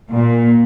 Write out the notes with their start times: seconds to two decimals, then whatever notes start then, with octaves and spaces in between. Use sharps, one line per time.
0.12 A#2